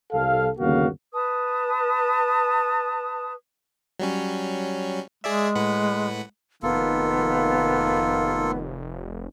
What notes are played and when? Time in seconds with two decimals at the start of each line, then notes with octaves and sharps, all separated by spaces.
0.12 C2 A4 F5
0.59 G1 D#2 C#3 A#3 F#4 F5
1.12 B4 A5 D#6
3.99 F#3 G3 C#4
5.24 G#3 G#4 D5 E5
5.55 A2 B4 F#5
6.63 F1 D#3 A#3 B3 F4 A4